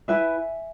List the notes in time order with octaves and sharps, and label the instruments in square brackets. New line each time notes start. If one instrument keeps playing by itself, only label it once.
[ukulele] E4 B4 E5 G#5